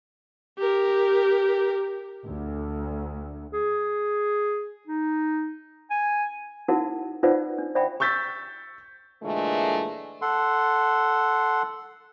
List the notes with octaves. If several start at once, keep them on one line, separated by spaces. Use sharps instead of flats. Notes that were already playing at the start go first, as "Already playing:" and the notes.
G4 A#4
D2
G#4
D#4
G#5
D#4 E4 F#4 A#4 F#5 A5
D#4 F4 B4 C5 D5 F#5
D4
C5 D5 E5 F#5 G5 B5
C#6 E6 G6 A6 B6
A#2 D3 E3 G#3 A3
A4 F#5 C6